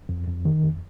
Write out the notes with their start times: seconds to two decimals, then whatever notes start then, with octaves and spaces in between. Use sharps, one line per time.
0.09 F2
0.27 F2
0.45 D#3
0.63 F2